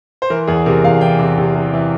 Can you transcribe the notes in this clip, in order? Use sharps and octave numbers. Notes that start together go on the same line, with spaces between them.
C5
E3 A#4
E2 G#4
C3 A#4
E2 F5
E3 G5
C3
C3
C3
E3